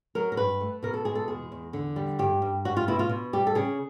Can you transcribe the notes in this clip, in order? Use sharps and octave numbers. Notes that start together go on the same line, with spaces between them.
F#3 A#4
A#4
G2 B4
A3
B2 A#4
A4
G#3 G#4
A4
E2 G#4
E2
D3
G3
G2 G4
G2
G3 F#4
F4
B2 E4
F4
B2
G3 G4
A4
C#3 G#4